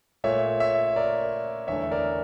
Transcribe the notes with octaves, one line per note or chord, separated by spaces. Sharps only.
A#2 A3 C#5 E5
C#5 E5
A#4 D5
E2 D3 A3 C#5 E5
A#4 D5